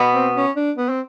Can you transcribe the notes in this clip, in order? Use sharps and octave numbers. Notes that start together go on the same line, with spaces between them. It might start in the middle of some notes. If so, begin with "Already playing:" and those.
Already playing: B2 B3
C4
C#4
D4
B3
C4